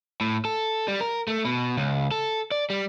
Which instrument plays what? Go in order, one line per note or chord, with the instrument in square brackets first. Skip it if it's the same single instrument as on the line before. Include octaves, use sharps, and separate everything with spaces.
[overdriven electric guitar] A2
A4
G3
A#4
A3
B2
C#2
A4
D5
G3